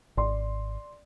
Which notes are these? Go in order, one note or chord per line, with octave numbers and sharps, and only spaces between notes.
G#1 D5 C6